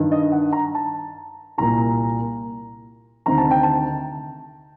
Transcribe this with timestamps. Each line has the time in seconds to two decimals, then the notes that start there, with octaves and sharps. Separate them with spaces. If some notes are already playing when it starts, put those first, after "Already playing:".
Already playing: G2 D#3
0.12 D#5
0.32 F#5
0.53 A#5
0.75 A5
1.58 C2 A#2 A#5
3.26 D2 C3 D#3 A#5
3.38 A5
3.51 G5
3.63 A5